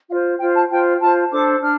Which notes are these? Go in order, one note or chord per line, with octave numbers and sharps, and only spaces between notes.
F4 C5 F5
F4 C5 G5
A5
F4 C5 G5
F4 C5 A5
D4 A4 C5 D6
D4 F6